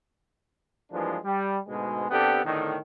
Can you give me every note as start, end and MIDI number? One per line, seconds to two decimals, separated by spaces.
0.92 1.16 43
0.92 1.16 52
0.92 1.16 53
0.92 1.16 56
0.92 1.16 58
0.92 1.16 62
1.24 1.58 55
1.67 2.08 38
1.67 2.08 44
1.67 2.08 47
1.67 2.08 56
2.10 2.42 48
2.10 2.42 59
2.10 2.42 62
2.10 2.42 67
2.10 2.42 69
2.44 2.77 40
2.44 2.77 45
2.44 2.77 50
2.44 2.77 51